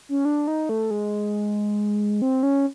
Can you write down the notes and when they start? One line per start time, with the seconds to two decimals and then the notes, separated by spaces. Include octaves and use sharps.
0.09 C#4
0.25 D4
0.47 D#4
0.69 A3
0.91 G#3
2.22 C4
2.43 C#4